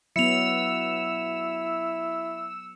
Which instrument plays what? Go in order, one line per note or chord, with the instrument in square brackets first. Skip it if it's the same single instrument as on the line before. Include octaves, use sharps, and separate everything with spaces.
[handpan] F#3 B3 [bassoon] E4 [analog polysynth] E6 [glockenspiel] C#7 F7